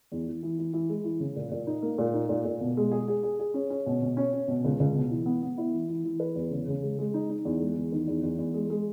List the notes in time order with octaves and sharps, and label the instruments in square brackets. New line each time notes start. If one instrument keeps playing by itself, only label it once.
[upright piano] E2
E3
E3
E3
E3
G#3
E3
C#3
A#2
A#2
D#4
A#3
A#2
D#4
A#2
A#2
B2
G#3
G#4
G#4
G#4
G#4
C#4
C#4
B2
B2
C#4
C#4
B2
C#2
C#2
B2
E3
B3
B3
E4
E3
E3
E3
B4
E2
C#3
C#3
G#3
G#3
D#4
D#4
E2
G#3
E2
D#3
E2
E2
E2
G#3
G#3